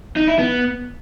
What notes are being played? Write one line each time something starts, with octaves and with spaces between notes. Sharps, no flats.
D#4
E4
B3